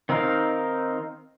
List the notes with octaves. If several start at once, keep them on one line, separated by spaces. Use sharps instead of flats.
D#3 C4 D#4 A#4 F5